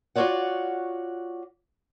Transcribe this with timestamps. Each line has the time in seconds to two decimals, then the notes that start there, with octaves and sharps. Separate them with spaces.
0.16 F4 F#4 A#4 C#5 D5 F#5